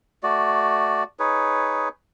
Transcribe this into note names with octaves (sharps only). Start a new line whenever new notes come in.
A3 F#4 D5
D#4 G#4 B4 C#5